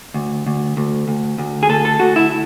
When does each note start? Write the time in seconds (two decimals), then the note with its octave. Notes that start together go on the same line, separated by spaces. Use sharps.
0.14 D2
0.46 D2
0.77 D2
1.08 D2
1.38 D2
1.63 G#4
1.69 D2 A4
1.85 A4
2.00 D2 F#4
2.16 E4